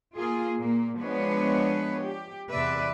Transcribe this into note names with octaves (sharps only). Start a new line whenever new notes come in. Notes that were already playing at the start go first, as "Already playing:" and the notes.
A#3 F4 G#4
A#2 A#3
F3 G#3 B3 D4 B4 C#5
G4
E2 C3 B4 D5 E5